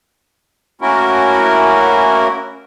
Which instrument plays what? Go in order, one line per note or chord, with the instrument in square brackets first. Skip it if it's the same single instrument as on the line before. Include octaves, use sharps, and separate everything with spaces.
[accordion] A3 A#3 C#4 E4 F#4 A#4